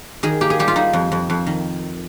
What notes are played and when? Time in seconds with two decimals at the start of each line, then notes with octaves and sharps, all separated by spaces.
0.23 D#3 G#4
0.41 A#3 G4
0.50 G#4
0.59 G3 G4
0.68 F4
0.76 G3 D#4
0.93 F2
1.12 F2
1.30 F2
1.47 D#3